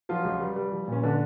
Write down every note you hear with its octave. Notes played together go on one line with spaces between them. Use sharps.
F3 F#3 F4
C#2
G3
G3
F3
A#2 C#4
D3 D4